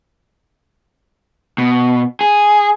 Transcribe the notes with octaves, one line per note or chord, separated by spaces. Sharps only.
B2
G#4